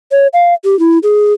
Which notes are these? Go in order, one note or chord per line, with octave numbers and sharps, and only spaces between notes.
C#5
F5
G4
E4
G#4